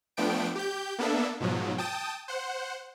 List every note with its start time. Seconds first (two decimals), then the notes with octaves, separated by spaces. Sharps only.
0.17 F3 A3 B3 D4 G5 D7
0.55 G4 G6
0.99 A#3 B3 D4 A4 E5
1.40 G#2 B2 F3 F#3
1.78 G5 A5 D#6
2.28 C5 F#5